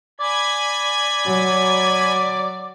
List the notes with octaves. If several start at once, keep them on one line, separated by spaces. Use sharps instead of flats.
D5 G#5 B5 G#6
F#3